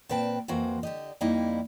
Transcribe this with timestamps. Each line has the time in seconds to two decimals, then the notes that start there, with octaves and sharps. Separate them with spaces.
0.09 A#2 C4 B4 G5 A5
0.48 F2 E3 A#3 F#4 C5
0.83 D3 G4 D#5
1.21 F2 G3 A#3 D#4 E4 D#5